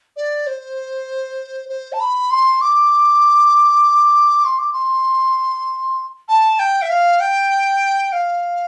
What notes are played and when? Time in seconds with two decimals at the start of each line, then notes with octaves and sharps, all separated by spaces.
0.16 D5
0.47 C5
1.69 C5
1.93 A5
2.00 B5
2.31 C6
2.61 D6
4.45 C6
4.59 D6
4.73 C6
6.28 A5
6.59 G5
6.82 E5
6.90 F5
7.20 G5
8.12 F5